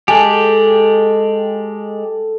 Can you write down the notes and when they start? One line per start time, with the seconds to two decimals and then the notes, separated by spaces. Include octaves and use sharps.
0.08 G#3 G4 A4 G#5